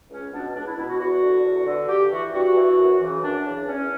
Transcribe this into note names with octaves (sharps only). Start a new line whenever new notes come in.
C#2 C#4
B2 D4
C#2 D4
E4
B2 E4
F#4
E2 F#4
D3
E2
D3
G2 G4
E3 F#4
G2 F#4
E3
F#2
C#3 E3
F#2 D4
C#3 E3
E2 C#4